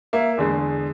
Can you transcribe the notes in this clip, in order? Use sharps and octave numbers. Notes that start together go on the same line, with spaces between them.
A#3 E5
E2 D3 G#3